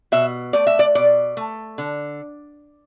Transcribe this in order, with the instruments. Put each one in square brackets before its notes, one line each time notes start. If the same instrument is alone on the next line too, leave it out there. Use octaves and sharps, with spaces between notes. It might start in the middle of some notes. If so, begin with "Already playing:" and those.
[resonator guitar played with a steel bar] B2 E5
A3 D5
E5
D5
B2 D5
A3
D3